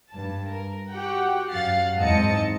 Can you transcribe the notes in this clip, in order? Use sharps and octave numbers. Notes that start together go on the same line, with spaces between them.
G2 A5
A#4
F#4 G4 F#5 G5
F#2 F#3 F5 F#5 A6 C7
E2 G#2 C4 D#5 A5 C#7